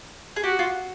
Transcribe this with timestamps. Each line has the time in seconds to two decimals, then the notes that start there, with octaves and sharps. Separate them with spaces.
0.36 G#4
0.44 F#4 G4
0.59 F4